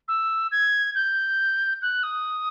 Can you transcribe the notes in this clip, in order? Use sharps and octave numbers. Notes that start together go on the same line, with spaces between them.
E6
G#6
G6
F#6
D#6